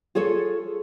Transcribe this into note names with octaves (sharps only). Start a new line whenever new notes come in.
F4 G#4 A4 C#5